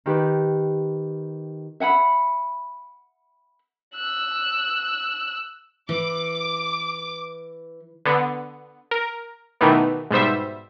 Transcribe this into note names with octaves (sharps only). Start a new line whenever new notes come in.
D#3 G4 B4
E5 F#5 G#5 B5
E6 F#6
E3 D6
D3 B3
A#4
B2 D#3 E3 A3 B3
G#2 B2 G3 C5 E5